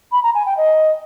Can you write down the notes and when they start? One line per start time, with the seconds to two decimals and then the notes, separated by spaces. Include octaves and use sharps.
0.12 B5
0.23 A#5
0.35 G#5
0.46 G5
0.57 D#5